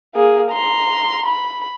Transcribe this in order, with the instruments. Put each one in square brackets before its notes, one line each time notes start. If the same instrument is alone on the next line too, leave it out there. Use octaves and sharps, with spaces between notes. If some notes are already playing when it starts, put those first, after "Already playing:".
[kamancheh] A#3 G#4
A#5 C6
B5